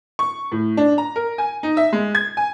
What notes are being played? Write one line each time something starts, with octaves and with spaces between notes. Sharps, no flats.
C#6
A2
D4
A#5
A#4
G#5
D#4
E5
G#3
G#6
G#5